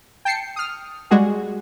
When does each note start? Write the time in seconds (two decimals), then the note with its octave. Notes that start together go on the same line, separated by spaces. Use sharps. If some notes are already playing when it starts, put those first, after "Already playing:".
0.25 G5 A5 C7 C#7
0.56 D#6 F6
1.11 G3 G#3 F#4 G#4